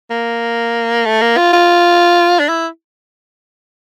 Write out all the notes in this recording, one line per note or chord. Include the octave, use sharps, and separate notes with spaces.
A#3
A3
A#3
F4
F4
D4
E4